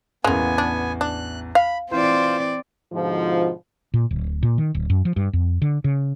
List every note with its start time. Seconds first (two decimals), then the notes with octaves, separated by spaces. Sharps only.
0.24 A1 E2 G#3 A#3 B3 G#5
0.58 D4
1.01 D4 F#6
1.55 F5 B5
1.91 E3 C4 F4 C5 D5
2.92 G#2 B2 D3 F3
3.94 A#2
4.11 D1
4.43 A#2
4.58 D#3
4.75 D1
4.90 F#2
5.05 F3
5.16 G2
5.33 F2
5.62 D3
5.84 C#3